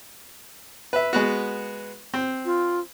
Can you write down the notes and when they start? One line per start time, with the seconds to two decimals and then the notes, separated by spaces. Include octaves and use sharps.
0.93 B4 E5
1.13 G#3 B3 F#4
2.14 C4
2.45 F4